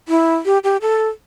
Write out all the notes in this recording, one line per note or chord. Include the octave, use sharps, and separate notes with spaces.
E4
G4
G4
A4